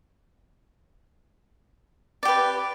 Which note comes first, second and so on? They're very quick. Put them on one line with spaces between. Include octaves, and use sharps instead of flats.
D5 G4 B4